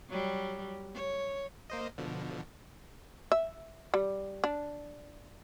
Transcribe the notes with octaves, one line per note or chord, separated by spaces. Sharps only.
F#3 G3
C#5
A#3 C5 D#5
B2 D3 F3
E5
G3
D4